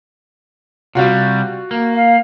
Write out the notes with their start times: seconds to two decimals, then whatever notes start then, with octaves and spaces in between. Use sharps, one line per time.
0.95 C3 G3 F4 F#4
1.71 A#3
1.94 F5